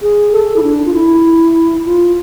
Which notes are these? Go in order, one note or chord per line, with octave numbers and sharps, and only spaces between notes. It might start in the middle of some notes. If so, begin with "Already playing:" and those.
G#4
A4
E4
D4
F4
E4
F4